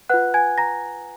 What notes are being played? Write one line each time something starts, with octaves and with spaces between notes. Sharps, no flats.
F4 B4 F#5 F#6
G#5 G#6
A#5 A#6